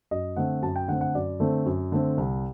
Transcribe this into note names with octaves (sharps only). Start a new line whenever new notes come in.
F#2 D#5
D3 A3 C4 F#5
F#2 A5
G5
D3 A3 C4 F#5
F#5
F#2 D5
D3 A3 C4
F#2
D3 A3 C4
C2